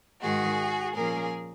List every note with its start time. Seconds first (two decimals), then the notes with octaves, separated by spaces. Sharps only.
0.22 G#2 D#3 G#3 F#4 G#4
0.94 A#2 F3 A#3 C#4 G#4 A#4